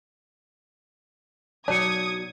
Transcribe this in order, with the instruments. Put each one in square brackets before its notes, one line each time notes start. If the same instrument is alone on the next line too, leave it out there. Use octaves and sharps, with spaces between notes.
[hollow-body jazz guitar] B1 F#3 [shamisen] D4 [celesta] C#5 C#7 [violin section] D#6 G#6